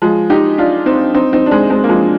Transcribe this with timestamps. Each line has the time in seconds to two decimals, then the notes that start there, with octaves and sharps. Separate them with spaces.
0.02 F3 G#3
0.30 D#4 G4
0.58 D4 F4
0.86 C4 D#4
1.14 C4 D#4
1.33 C4 D#4
1.46 D4
1.51 G#3 C4
1.70 G#3 C4
1.84 A#3
1.89 F3 G#3